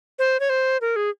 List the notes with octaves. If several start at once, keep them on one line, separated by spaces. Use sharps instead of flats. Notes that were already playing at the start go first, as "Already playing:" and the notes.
C5
C#5
C5
A#4
G#4